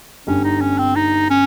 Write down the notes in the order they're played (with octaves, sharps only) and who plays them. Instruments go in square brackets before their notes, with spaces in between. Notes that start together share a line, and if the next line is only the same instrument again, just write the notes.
[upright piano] G1 G2 G3 [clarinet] C#4
[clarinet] D#4
C#4
C4
D#4
C#4